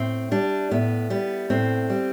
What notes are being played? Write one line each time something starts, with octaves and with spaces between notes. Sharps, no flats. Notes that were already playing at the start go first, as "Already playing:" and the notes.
Already playing: A2 C4
G3 D4
A2 B3
G3 B3
A2 C4
G3